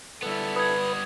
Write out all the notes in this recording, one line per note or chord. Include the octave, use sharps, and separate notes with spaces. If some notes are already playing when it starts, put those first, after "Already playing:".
G3 B3 E4 A4
B4 B5 D#6 G#6